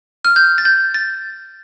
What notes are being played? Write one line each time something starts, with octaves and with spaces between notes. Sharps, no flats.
F6
G6
A6
G6
A6